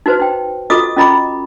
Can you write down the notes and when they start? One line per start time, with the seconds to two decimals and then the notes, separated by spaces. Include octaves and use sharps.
0.06 D#4 F#4 B4 C5
0.20 D#4 G5
0.70 F4 F#4 A4 D#5 D6 D#6
0.97 C#4 F4 D#5 A#5 B5 D6